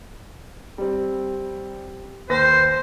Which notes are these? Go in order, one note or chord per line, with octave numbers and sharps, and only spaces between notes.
G3 C4
D#2 B4 C5 A#6